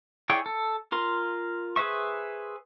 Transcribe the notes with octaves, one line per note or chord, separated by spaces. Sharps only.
E4 G#4 C#5 D5 G5
A4
F4 A#4 C6
G#4 B4 C5 E5 C#6